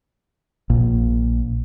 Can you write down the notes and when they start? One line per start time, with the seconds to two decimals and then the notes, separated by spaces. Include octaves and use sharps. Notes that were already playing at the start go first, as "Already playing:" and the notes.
0.70 A#1 A#2